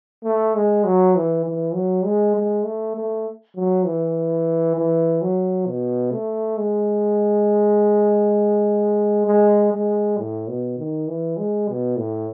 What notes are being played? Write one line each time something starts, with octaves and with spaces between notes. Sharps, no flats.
A3
G#3
F#3
E3
E3
F#3
G#3
G#3
A3
A3
F#3
E3
E3
F#3
B2
A3
G#3
G#3
G#3
A2
B2
D#3
E3
G#3
B2
A2